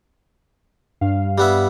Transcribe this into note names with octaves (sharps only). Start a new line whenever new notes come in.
G2 F5
G3 B3 E5